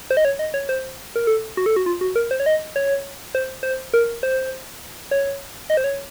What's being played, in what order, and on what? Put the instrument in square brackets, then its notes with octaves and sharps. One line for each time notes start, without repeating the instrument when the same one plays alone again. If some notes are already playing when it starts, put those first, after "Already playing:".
[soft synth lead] C5
D#5
C#5
D#5
C#5
C5
A#4
A4
F#4
A4
F#4
F4
F#4
A#4
C5
C#5
D#5
C#5
C5
C5
A#4
C5
C#5
D#5
C5
C#5